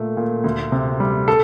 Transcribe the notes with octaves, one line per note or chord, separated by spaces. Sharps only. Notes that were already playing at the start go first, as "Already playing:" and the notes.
Already playing: A#2 A3
A#2
D2
C3
G3
A4